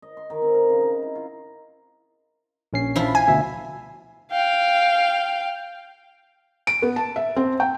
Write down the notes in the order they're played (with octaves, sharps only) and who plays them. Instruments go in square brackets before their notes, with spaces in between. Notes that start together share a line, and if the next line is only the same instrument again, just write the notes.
[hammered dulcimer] D#5
C6
D#3
C4
A#4
C#3
D#4
E4
F4
[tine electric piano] A#1 C#4 C7
[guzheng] F3 E4
[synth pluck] G#5
[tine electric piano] D2 B2 E5
[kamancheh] F5 G5
[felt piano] D7
B3
A5
E5
C4
G5